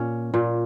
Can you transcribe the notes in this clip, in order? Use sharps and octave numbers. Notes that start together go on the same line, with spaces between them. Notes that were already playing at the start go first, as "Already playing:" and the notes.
Already playing: A#2 C#4
A#2